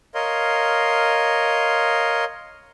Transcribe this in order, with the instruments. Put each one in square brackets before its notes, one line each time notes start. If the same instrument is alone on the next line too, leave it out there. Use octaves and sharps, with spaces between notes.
[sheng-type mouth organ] A#4 C#5 D#5 F5 C6